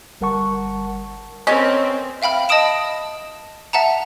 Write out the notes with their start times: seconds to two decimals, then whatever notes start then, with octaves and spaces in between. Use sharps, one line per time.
0.21 G1 G3 A#4 F#5 A5 C#6
1.47 C4 C#4 A#4 B4 C#5 D#5
2.22 E5 F5 G5 B5 F6
2.49 D#5 A5 B5 D#6 D7 E7
3.73 E5 F#5 A5 A#5